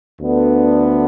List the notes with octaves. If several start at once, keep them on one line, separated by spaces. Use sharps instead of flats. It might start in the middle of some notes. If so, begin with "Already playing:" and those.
D2 D3 B3 D4